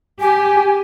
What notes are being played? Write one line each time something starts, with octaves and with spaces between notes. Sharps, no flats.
G4 G#5